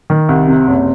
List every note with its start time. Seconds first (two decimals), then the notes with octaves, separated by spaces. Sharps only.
0.10 D#3
0.29 C2
0.48 C3
0.68 F#1